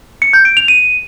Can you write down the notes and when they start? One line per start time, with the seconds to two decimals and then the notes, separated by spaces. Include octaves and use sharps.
0.22 C#7
0.33 G6
0.45 D7
0.57 F7
0.68 D#7